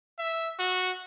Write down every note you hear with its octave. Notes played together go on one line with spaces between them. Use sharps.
E5
F#4